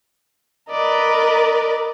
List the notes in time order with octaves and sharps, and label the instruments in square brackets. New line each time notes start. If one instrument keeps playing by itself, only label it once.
[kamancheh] A#4 D#5 [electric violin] B4 D5